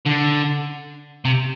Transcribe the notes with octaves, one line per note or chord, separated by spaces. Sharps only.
D3
C3